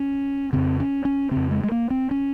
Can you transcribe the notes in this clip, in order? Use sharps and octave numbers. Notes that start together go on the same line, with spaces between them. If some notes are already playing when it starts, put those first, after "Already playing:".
Already playing: C#4
F2 C#3 C4
C#4
C#4
F2 C#3 C4
G#3
G#3
A#3
C4
C#4